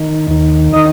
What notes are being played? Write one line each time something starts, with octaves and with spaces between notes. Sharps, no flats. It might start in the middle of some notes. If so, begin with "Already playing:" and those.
Already playing: D#3
D#2 D#3
D#3 D#4 D#5